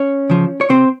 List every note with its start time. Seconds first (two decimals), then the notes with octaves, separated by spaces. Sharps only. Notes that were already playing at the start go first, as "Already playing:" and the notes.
Already playing: C#4 C#5
0.30 C#3 F3
0.61 C#5
0.69 C3 C4 C5